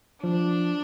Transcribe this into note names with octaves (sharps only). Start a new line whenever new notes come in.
F3 D4